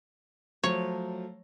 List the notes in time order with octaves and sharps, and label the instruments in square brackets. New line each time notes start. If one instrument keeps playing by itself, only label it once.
[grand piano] F3 F#3 A3 [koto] C#5